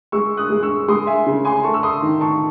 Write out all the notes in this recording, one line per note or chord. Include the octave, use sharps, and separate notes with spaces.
G#3 C#6 E6
D#6 F#6
G#3
C#6 E6
G#3 C6 D#6
E5 G#5
C#3
G#5 C6
A3 A5 C#6
E6
C6 D#6
D#3
A5 C#6